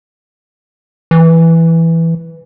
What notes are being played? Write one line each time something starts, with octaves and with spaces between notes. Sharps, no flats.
E3